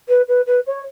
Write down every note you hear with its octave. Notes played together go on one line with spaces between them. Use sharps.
B4
B4
B4
C#5